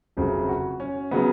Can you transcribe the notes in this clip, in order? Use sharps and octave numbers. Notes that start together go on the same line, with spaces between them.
F1 F2 C#3 F#3
F#4
C#4
C#3 F#3 B3